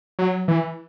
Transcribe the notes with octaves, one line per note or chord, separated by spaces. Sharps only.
F#3
E3